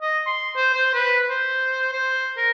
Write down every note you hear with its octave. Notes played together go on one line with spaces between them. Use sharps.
D#5
C6
C5
C5
B4
C5
C5
A#4